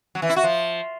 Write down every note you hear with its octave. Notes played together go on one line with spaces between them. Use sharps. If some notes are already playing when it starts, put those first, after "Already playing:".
F#3
E3
E4
F#4
F3